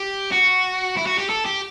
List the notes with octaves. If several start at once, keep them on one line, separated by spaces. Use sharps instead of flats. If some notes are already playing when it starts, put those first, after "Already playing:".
Already playing: G4
F#4
E4
F#4
G4
A4
G4